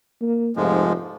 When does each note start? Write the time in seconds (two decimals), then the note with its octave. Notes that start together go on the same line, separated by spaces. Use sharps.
0.21 A#3
0.57 F1 G#2 F3 G#3